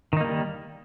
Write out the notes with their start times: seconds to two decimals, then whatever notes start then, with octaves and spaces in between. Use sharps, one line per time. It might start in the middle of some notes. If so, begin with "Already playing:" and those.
0.13 D#3
0.17 D#4
0.21 A#3
0.25 G3